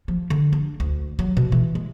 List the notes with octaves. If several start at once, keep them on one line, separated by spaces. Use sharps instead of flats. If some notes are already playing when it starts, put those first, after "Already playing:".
F3
D3
D4
D2
F#3
B2
E3
G#3